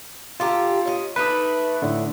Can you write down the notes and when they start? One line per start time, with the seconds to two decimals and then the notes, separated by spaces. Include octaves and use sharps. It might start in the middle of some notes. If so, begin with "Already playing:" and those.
0.40 D3 F4 G4 A#5
0.85 C#4 D#5
1.16 A3 D4 D#4 B4
1.82 A2 D3